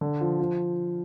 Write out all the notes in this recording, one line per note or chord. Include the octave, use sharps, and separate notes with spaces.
D3
F3
F3